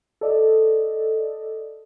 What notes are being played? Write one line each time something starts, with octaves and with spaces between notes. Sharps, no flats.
A4 D5 D#5